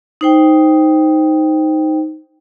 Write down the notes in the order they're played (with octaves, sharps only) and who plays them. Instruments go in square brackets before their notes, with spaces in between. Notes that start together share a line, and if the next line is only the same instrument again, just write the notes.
[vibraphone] D#4 C5 G5